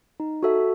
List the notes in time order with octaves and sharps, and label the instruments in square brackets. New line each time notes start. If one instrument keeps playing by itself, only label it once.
[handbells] D#4
F#4 A4 E5